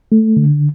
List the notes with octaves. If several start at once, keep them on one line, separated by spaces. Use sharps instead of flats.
A3
D3